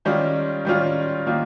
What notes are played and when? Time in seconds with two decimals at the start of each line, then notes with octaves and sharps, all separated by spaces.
0.05 D#3 G3 C#4 F4
0.65 D#3 G3 C#4 F4
1.27 D#3 A#3 F4